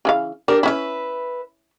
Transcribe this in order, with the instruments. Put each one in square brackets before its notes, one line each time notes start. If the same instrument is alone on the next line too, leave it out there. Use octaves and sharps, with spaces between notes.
[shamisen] C#3 E3 F5
[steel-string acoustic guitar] D4 G4 A#4 [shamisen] D5
[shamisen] C#4 E4 [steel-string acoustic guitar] B4 E5